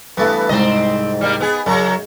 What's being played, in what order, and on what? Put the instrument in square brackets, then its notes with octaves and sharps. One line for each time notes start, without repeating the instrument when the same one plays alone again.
[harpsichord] G2 E3 A3 [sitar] B3
[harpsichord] C2 G#2 [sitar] C4 D#5
[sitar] G3 A#3
B3 G#4
[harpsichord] F#2 A#5 C#6 [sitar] C#3